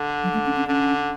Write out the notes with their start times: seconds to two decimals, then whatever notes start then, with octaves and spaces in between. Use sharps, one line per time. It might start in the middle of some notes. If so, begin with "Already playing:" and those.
Already playing: D3
0.23 F#3
0.34 A3
0.46 C#4
0.56 C#4
0.67 D3 C#4